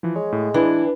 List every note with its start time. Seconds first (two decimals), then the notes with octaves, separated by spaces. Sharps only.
0.03 E3 F3
0.16 G#3 C#5
0.32 A2
0.54 E3 D4 E4